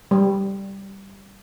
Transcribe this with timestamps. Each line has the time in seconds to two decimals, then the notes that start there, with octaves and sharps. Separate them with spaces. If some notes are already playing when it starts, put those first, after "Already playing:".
0.11 G3